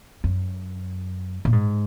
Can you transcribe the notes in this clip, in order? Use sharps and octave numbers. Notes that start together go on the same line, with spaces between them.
F#2
A#2
G#2